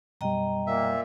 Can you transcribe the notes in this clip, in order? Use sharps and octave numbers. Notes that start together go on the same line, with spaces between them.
F#2 B2 G3 D#5 G5 A#5
A#2 A#3 E5